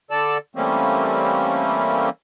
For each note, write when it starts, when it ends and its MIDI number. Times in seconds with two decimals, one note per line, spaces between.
0.11 0.38 50
0.11 0.38 69
0.11 0.38 74
0.11 0.38 81
0.11 0.38 88
0.56 2.09 52
0.56 2.09 55
0.56 2.09 57
0.56 2.09 58
0.56 2.09 60
0.56 2.09 61